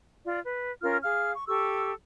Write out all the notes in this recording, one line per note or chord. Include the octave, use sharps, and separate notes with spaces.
F4 D5
B4
C#4 F4 A#4 F6
G#4 F5 F6
C#6
G4 A4 C#6 E6